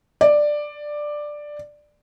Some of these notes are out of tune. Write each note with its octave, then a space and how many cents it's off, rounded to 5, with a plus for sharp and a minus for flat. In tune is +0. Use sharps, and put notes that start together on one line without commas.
D5 +10